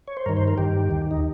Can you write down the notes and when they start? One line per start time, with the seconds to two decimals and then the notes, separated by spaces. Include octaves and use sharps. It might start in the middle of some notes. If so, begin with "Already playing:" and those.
0.08 C#5
0.17 C5
0.26 G2 D#3 A#4
0.37 C5
0.48 A#4
0.58 G2 D#3 G4
0.89 D#2 D#3
1.11 D#4